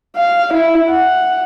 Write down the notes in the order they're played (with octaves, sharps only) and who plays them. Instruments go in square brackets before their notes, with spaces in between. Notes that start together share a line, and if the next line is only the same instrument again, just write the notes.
[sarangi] F5
E4
F#5